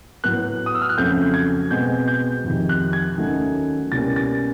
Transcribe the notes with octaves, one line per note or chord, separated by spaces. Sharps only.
A2 F#3 B3 F#6
D#6
E6
F6
F#6
F2 C#3 F#3 A3 C4 G6
G#6
B2 G#3 C4 G6
G6
F2 C3 D#3
F#6
G#6
D#2 D#3 F#3 A3 C#4
C2 B2 G3 A#3 C#4 A6
A6